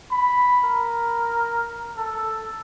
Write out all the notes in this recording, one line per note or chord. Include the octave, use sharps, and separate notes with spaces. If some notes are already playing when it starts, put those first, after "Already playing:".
B5
A#4
A4